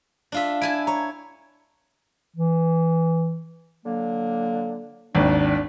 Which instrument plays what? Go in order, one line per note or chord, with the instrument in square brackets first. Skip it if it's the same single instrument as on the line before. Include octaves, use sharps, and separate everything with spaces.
[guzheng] D4 F4 E5
[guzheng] E4 G#5 A5 [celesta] D7
[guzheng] C#5 [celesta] A#5
[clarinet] E3
[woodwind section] D3 F#3 A#3
[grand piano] G#1 D#2 [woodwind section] D4